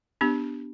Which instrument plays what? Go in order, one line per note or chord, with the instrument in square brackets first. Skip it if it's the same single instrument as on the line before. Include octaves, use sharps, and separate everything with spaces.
[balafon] B3 D4 G4